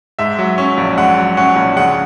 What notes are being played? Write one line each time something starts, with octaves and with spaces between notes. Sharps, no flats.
G#2 E5
F#3
C#4
A#1
G#2 F#5
F#3
C#4 F#5
A#1
C#3 F#5